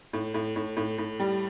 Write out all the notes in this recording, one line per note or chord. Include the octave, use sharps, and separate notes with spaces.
A2
A2
A2
A2
A2
G3